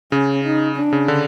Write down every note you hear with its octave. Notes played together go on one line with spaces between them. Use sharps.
C#3 C#4
D#4
D4
C#3
D3